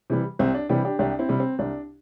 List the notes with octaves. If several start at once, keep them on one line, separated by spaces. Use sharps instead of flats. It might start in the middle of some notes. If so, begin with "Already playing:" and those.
C3 E3 G3
C2 C4
D4
C3 E3 G3 D4 G4
D4 G4
C2 D4 G4
C4 E4
C3 G3
C4
C2 D4